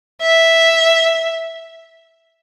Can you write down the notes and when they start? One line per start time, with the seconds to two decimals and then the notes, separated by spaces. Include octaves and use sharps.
0.22 E5